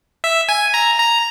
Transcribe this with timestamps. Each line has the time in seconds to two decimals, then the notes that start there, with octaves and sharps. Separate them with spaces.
0.24 E5
0.49 G#5
0.74 A#5
1.00 A#5